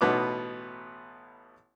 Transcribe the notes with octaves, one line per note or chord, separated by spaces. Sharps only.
A1 B2 B3 D#4 D6